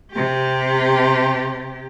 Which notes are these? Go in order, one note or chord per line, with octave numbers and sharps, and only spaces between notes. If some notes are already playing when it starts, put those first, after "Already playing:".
C3 G4